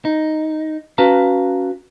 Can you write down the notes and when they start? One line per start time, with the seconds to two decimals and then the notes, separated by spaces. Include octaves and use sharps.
0.05 D#4
0.98 C#4 F#4 B4 F5 A5 A#5